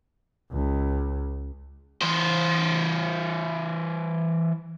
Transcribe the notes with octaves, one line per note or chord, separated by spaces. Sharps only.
C#2
E3 C5